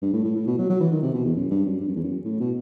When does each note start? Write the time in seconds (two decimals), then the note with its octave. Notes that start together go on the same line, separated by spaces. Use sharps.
0.02 G2
0.13 A2
0.24 A2
0.35 A2
0.47 B2
0.58 F#3
0.70 F#3
0.80 E3
0.92 D#3
1.02 C3
1.14 B2
1.25 E2
1.36 F#2
1.51 G2
1.66 F#2
1.80 G2
1.88 F#2
1.96 E2
2.04 F#2
2.25 A2
2.40 B2